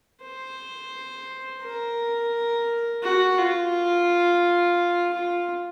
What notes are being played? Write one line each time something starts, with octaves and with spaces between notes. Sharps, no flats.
C5
A#4
F#4
F4
F4